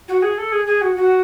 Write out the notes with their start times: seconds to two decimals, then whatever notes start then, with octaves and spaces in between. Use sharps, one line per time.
0.08 F#4
0.22 G#4
0.37 A4
0.52 G#4
0.67 G#4
0.81 F#4
0.96 F#4